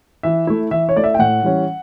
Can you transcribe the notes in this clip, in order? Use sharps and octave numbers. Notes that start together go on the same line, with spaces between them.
E3 E5
A3 E4
E3 E5
C#5
A3 E4 D5
E5
G5
A2 F#5
E3 G3 C#4